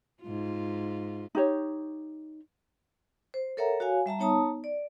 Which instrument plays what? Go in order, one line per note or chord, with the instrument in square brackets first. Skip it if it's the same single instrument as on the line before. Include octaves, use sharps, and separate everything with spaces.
[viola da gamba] G#2 F4
[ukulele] D#4 G4 C#5
[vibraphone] C5
A4 A#4 C#5 E5 F#5 A#5
F#4 C#5 F5 G#5
G3 E5 A5 A#5
B3 D#4 C#5 A5 A#5 D#6
D5